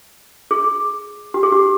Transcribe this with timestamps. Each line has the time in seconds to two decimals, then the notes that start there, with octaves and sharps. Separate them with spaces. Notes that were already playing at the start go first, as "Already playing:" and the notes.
0.51 G#4
1.34 G4
1.43 G#4
1.52 G4